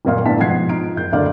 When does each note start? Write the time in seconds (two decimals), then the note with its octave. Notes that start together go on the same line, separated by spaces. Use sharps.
0.05 D#1 F#2 A#2 F5
0.25 G1 A2 B3 D4 A5 B6
0.40 G#2 B2 F3 F#5 G#6 C7
0.69 D#4 F4 D7
0.96 F#1 G6
1.12 F#1 D2 A3 D4 D5 F5